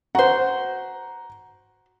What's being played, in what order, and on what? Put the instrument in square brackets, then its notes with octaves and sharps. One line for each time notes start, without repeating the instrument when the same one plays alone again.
[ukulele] F#4 C5 [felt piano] F#5 A#5